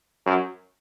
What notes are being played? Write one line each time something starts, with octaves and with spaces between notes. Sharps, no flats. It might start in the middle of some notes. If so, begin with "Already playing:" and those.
F#2